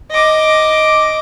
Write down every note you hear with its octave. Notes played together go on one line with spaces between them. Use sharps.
D#5 D6